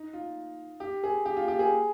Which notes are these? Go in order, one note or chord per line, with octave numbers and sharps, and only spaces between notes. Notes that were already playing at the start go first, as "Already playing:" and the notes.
Already playing: D#4
F4
G4
G#4
G4
F4
G4
G#4